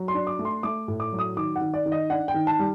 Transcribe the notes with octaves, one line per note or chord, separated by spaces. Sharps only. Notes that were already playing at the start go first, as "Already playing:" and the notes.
Already playing: F#3
C6
D4
D6
A3
C6
A3 D6
A2
D6
F#3
D#6
D#3 D6
F#5
D#3
D5
D#3
D#5
D4 F#5
G5
D#3
A5
G3